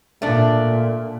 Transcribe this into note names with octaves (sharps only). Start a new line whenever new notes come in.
A#2 A3 D4